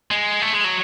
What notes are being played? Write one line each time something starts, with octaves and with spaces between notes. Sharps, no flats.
G#3
A3
G#3
F#3